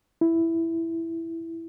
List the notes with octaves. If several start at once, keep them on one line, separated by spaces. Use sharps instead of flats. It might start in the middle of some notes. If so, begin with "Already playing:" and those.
E4